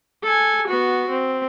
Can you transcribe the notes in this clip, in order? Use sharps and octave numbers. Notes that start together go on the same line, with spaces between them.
A4 G#5
B3 F#4
C4